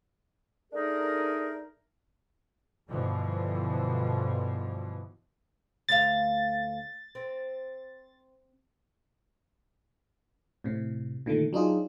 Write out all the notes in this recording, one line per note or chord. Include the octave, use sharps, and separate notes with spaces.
A3 D4 D#4 G#4 A#4
G2 B2 D3 E3 F3
D2 F5 A6
C4
A2 C3
A#2 D3 D#3 A3
F#3 D4 D#4 F4 G#4